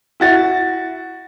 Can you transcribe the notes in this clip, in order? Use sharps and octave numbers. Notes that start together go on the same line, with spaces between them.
E4 F#4 A6